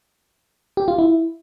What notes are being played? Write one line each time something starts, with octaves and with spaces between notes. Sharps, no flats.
G4
F4
E4